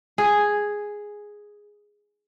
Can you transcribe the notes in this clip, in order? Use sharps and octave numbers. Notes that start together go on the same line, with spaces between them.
G#4